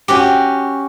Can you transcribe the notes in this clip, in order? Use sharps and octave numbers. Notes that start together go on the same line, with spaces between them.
C#4 F#4 G4